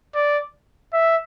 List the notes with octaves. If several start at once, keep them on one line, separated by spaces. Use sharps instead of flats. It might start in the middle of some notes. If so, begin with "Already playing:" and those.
D5
E5